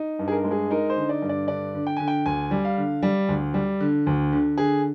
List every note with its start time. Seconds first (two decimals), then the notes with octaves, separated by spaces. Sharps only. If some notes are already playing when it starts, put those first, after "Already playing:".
Already playing: D#4
0.19 G2
0.28 G#4
0.32 A#4
0.44 G#3
0.51 G#4
0.71 D#4 A#4
0.90 C5
0.96 D3
1.09 D5
1.22 G2
1.29 D5
1.48 D3 D5
1.75 D3
1.87 G5
1.97 D3 G#5
2.08 G5
2.26 D2 G#5
2.51 G3
2.65 F5
2.77 D3
3.03 G3
3.29 D2
3.54 G3
3.80 D3
4.07 D2
4.33 D3
4.58 D3 G#4